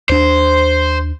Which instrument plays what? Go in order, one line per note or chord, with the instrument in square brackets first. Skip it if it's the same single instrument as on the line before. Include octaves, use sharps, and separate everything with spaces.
[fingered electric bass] D#2 D4 [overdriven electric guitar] C5